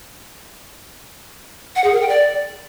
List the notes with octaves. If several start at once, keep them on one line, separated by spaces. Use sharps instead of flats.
F#5
G#4
A#4
G5
D5